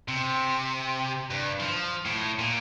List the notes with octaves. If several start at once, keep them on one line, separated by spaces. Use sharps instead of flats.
C3
G2
F3
A2
A#2